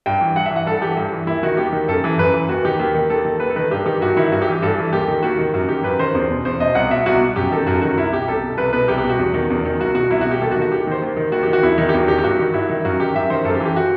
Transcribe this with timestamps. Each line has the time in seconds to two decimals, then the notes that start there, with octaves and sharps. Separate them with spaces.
0.06 G2 G5
0.21 E3
0.36 G2 F#5
0.46 E5
0.51 E3
0.56 F#5
0.66 G2 A4
0.81 E3 G4
0.97 G2
1.12 E3
1.27 D#2 E4
1.43 D#3 F#4
1.57 D#2 G4
1.72 D#3
1.88 F#2 A4
2.04 E3
2.18 F#2 B4
2.34 E3
2.49 D#2 F#4
2.65 D#3 G4
2.79 D#2
2.94 D#3
3.10 D#2 A4
3.25 D#3
3.40 D#2 B4
3.50 A4
3.56 D#3 B4
3.71 G2 G4
3.86 D#3 G4
4.01 G2 F#4
4.16 D#3 E4
4.32 G2 F#4
4.42 G4
4.47 E3
4.52 G4
4.62 G2 A4
4.78 E3
4.92 D#2 G4
5.08 D#3
5.23 D#2 F#4
5.39 D#3
5.54 F#2 F#4
5.69 D#3 G4
5.83 F#2 B4
5.99 D#3 C5
6.15 E2
6.30 B2
6.45 E2 C5
6.60 B2 D#5
6.75 C2 F#5
6.90 B2 E5
7.06 C2 F#4
7.21 B2
7.36 F#2 G4
7.51 D#3 A4
7.66 F#2 F#4
7.81 D#3 F#4
7.97 C2 E4
8.12 B2 G4
8.28 C2 A4
8.44 B2
8.58 C2 B4
8.73 B2 B4
8.88 C2 G4
8.98 G4
9.04 B2
9.09 F#4
9.18 E2
9.34 D#3
9.50 E2
9.65 D#3
9.79 C2 F#4
9.95 B2 F#4
10.10 C2 E4
10.21 F#4
10.26 B2 G4
10.41 D#2 A4
10.51 F#4
10.56 D#3
10.62 F#4
10.72 D#2 G4
10.87 D#3 C5
11.02 D#2
11.16 D#3
11.32 D#2 F#4
11.43 D#3 G4
11.53 F#4
11.63 E2 E4
11.78 D#3
11.89 G4
11.94 E2 F#4
12.08 D#3 G4
12.18 G4
12.23 G2 F#4
12.39 D#3
12.54 G2 E4
12.69 D#3
12.85 F#2 F#4
13.00 D#3 G4
13.14 F#2 E5
13.30 D#3 C5
13.45 F#2 A4
13.55 G4
13.60 E3
13.65 G4
13.76 F#4